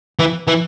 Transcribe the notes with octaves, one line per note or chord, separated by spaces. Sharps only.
E3
E3